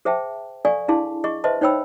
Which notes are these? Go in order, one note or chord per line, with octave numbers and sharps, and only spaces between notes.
G#4 C5 E5 G5 A5
A4 D5 F5 G#5 C#6
D4 E4 G#4 F5 A5 C6
G#4 D#5 C#6
B4 C5 D#5 E5 A5 C6
D#4 C5 C#5 G5 B5 E6